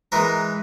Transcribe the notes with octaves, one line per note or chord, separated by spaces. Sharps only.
E3 G#3 A#4